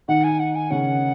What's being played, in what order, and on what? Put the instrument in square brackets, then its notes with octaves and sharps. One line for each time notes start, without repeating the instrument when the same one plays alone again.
[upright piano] D#3 D#4 [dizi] F#5
[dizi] G#5
F#5
G#5
[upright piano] C#3 C#4 [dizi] F#5